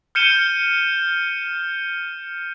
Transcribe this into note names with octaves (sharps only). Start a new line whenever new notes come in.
F6 G6 C#7 D#7 E7 G7